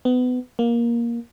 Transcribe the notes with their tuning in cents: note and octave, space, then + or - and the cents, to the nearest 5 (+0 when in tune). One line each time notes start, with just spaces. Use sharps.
B3 +25
A#3 +15